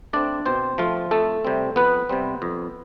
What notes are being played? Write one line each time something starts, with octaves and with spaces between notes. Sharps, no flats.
A3 C4 D4 D5
B2 C4 C5
F3 A3 C4 F4
F2 A3 A4
C3 G3 C4
F2 B3 B4
C3 G3 C4
F2